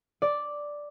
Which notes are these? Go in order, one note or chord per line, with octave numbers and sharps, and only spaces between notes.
D5